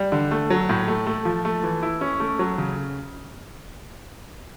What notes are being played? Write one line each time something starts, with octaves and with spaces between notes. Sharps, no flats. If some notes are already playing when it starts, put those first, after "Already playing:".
Already playing: G3
D3
A3
F#3
A2
A3
A3
F3
A3
E3
E4
C#4
A3
F#3
C#3